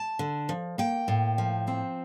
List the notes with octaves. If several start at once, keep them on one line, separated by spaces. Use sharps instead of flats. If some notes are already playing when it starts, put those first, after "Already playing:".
Already playing: A5
D3
F3
A#3 G5
A2
F3
C4